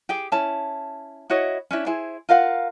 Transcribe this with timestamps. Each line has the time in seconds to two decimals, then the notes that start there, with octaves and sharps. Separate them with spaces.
0.09 G4 G#4 G5
0.32 C#4 E4 A5
1.30 E4 F#4 C#5 D#5
1.71 C#4 D4 E4
1.86 E4 G#4 C5
2.29 F4 A#4 F5 F#5